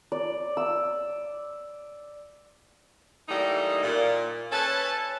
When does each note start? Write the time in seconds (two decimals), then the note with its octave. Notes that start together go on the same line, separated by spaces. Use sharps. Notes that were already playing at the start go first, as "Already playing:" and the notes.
0.12 D5
0.57 E6
3.29 E3 G3 A3 A#3 D#4 D#5
3.83 A#2
4.52 C#4 B4 C#5 E5 A5